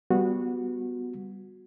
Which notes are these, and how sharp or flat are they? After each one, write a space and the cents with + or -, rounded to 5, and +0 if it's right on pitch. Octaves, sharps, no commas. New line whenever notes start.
G3 +0 B3 +0 F#4 -20